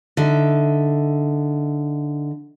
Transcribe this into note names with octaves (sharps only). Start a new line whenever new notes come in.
D3 D#4 E5